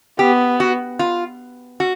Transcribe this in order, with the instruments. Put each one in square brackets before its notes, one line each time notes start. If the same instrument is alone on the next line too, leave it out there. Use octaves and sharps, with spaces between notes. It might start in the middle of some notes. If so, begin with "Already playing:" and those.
[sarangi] B3 [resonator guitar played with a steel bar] G4
[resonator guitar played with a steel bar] F#4
F4
F#4